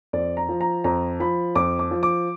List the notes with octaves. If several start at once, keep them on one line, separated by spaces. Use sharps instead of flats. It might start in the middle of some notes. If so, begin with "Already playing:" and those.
F2 D5
A#5
F3
A#5
F2 A#5
F3 B5
F2 D6
D6
F3
D6